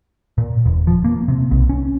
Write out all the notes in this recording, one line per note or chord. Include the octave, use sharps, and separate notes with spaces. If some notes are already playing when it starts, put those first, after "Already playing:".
A#2
E1
F3
A#3
C3
B1
C#4